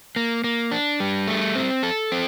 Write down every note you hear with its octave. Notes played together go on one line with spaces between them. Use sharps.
A#3
A#3
D4
G3
A3
C4
A4
C4